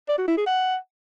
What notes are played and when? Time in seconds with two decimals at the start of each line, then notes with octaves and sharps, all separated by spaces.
0.09 D5
0.18 F#4
0.28 E4
0.37 G#4
0.47 F#5